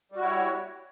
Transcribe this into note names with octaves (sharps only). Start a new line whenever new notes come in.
G3 E4 F#4 C#5